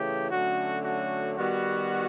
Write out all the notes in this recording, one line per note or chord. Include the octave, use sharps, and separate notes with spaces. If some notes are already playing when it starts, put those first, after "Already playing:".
Already playing: C#3 E3 A3 G4
D3 F#3 A3 C#4 F#4
F#4
D#3 G3 B3 F#4